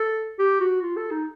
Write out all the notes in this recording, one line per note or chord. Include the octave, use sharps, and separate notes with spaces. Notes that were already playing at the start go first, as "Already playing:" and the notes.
Already playing: A4
G4
F#4
F4
A4
D#4